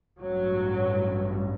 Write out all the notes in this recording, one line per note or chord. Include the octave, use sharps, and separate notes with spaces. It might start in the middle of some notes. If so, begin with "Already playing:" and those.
A1 G2 F#3